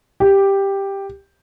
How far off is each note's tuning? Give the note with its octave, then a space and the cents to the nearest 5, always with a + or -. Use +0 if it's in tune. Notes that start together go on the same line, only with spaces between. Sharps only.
G4 +5